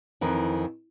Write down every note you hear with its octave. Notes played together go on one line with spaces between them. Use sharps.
F2 D#3 E3